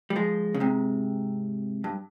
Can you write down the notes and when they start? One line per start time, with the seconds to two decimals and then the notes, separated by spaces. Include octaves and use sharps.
0.10 G3
0.16 F3 G#3
0.55 C#3
0.60 G#2 C3
1.84 G2